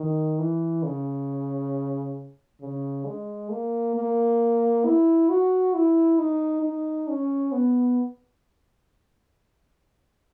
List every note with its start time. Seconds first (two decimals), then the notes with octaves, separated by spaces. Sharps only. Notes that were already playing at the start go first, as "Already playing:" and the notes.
Already playing: D#3
0.39 E3
0.83 C#3
2.61 C#3
3.06 G#3
3.51 A#3
3.96 A#3
4.85 E4
5.29 F#4
5.74 E4
6.19 D#4
6.63 D#4
7.08 C#4
7.52 B3